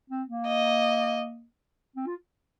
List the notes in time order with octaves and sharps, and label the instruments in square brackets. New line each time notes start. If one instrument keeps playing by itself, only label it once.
[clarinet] C4
A#3
[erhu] D#5
[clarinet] C4
F4